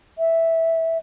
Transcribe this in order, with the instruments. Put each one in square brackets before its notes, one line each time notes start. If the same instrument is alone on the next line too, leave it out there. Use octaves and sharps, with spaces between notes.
[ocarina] E5